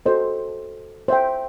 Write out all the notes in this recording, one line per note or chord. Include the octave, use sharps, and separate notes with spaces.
F#4 A4 C5 D#5
C5 E5 G5